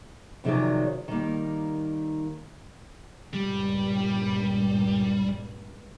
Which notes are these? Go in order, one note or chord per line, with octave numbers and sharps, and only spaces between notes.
F2 C3 D#3 F#3 G#4 D5
D#3 G3 A#3
C#2 G2 A#2 G3